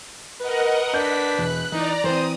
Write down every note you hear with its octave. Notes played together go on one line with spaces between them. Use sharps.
A#4 B4 D#5 F#5
D4 G6 B6
E1 F#6
E3 D#4 D5 A#5
E3 C4 C5 D#6